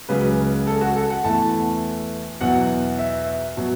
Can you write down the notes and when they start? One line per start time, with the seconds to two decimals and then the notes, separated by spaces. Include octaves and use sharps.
0.09 C#2 C#3 F#3 B4
0.67 A4
0.81 F#4
0.96 A4
1.10 F#5
1.24 E2 E3 A3 A5
2.41 E2 B2 F#3 F#5
2.99 E5
3.57 B2 F#3